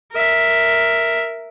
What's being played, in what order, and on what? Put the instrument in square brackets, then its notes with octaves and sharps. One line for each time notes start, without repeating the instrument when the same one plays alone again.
[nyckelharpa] A#4 E5